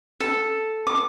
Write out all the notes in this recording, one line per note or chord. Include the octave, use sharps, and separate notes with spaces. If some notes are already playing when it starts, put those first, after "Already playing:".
A4
D6